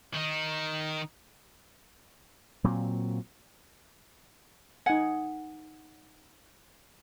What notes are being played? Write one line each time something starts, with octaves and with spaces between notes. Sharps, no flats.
D#3 D#4
A#2 F#3 C4
D#4 F#5 G#5